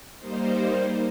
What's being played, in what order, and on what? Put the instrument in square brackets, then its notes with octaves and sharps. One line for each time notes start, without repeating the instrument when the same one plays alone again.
[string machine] G3 A#3 D#4 C5